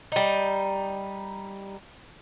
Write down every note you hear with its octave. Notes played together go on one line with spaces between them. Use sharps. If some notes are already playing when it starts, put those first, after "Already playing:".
G3 D#4